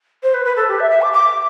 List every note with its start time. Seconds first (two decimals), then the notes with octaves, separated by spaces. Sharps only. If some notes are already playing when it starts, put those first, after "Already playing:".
0.23 C5
0.34 B4
0.45 B4
0.56 A4
0.68 G4
0.80 E5
0.90 E5
1.02 D6
1.13 D6